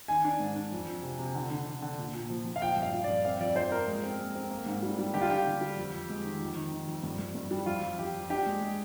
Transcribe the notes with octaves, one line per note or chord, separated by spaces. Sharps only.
D#3 G#5
D4
G#2
D4
F2
F2
C3
C3
D3
D3
D3
D3
A#2
A#2
F3
A#2
F5
F3 G5
G2
F5
F3
D5
G2
C4 F5
F2 D5
F2 C5
F3 A#4
G#3
C4
G#3
C4
A#3
G#2
G3
G3
D3 G4
F4
D3 G4
D3
G3
F2
F2
G#3
D#3
F2
D#3
D#3
F2
G2
G2
G2
G3
F2 F4
F2
F2 G4
F2
D4 G4
G#3
G#3